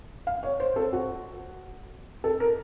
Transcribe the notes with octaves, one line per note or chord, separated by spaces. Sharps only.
F5
C#5
C5
A4
F#4
A4
A#4